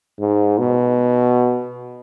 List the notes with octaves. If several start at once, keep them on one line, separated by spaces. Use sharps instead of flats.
G#2
B2